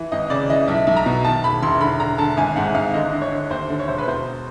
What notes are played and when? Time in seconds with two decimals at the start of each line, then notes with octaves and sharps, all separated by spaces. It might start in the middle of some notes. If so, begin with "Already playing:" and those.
Already playing: E3
0.12 G#1 D#5
0.30 C#3 D5
0.49 E3 D#5
0.68 B1 E5
0.87 B1
0.97 A#5
1.06 B2
1.25 D#3 A5
1.44 E1 B5
1.63 E1 C6
1.81 D3 B5
2.00 D3 A#5
2.18 D3 A5
2.37 G#1 G#5
2.56 G#2 F#5
2.75 G#1 F5
2.94 D3 D#5
3.12 D3
3.22 C#5
3.32 D3
3.50 D#2 C5
3.70 D3
3.79 C#5
3.88 E1 C5
3.98 B4
4.07 B2 C5